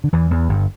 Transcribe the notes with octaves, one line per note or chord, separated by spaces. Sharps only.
D3
E2 E3
E2 E3
G1 G2